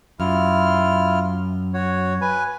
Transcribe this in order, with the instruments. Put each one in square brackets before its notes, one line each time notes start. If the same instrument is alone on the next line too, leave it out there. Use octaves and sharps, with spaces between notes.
[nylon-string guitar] F#2 [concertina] E4 F4 F6
[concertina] F#4 C#5
B4 G#5